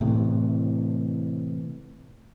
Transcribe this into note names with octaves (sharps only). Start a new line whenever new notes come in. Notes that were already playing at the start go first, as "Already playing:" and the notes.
A2 C3 E3